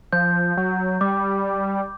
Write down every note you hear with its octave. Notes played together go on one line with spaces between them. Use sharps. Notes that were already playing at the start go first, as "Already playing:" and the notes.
F3 G6
F#3
G3 D6